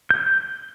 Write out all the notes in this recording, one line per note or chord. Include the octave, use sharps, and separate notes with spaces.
G6